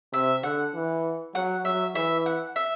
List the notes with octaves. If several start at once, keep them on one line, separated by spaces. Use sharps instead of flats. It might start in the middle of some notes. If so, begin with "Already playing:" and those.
C3 E5
D3 F#5
E3
F#3 F#5
F#3 E5
E3 E5
F#5
E5